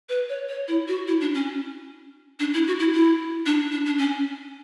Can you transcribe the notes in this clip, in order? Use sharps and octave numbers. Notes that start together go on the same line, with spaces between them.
B4
C#5
C#5
E4
F#4
E4
D4
C#4
D4
E4
F#4
E4
E4
D4
D4
D4
C#4